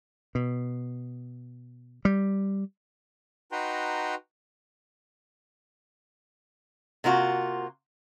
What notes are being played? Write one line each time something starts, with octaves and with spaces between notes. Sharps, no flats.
B2
G3
D#4 F#4 B4 G5 A#5 C6
C3 A#3 F4 F#4